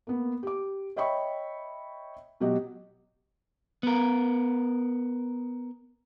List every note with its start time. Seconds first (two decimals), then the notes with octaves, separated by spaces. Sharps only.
0.07 A#3 B3
0.43 G4 D6
0.96 C#5 D#5 E5 G5 B5 C#6
2.40 B2 F#3 F#4 G4 D#5
3.83 B3 A#4